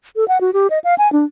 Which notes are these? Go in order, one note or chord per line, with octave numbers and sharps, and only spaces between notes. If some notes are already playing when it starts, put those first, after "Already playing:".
A4
F#5
F#4
G4
D#5
F5
G#5
D4